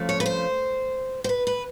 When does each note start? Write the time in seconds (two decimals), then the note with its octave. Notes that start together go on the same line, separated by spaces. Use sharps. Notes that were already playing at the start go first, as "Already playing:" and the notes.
Already playing: F2 C#3 F3 A3
0.09 C#5
0.20 B4
0.26 C5
1.24 C5
1.29 B4
1.47 B4